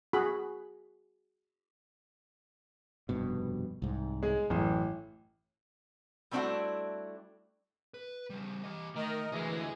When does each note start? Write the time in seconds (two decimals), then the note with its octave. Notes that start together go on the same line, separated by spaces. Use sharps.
0.13 F#4 G#4 B5
3.09 F1 G2 B2
3.82 C2 G#2
4.23 G#3 G#4
4.50 A1 F#2 E3
6.31 G3 A3 C4 D4 E4 F#4
7.94 B4
8.30 C#3 G3
8.64 G4 D#5
8.96 D#3 A3 A#4 D#5
9.32 D2 E3 G#3 G#4